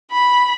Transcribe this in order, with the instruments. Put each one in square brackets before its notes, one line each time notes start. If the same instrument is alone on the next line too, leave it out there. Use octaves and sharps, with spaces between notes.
[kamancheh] B5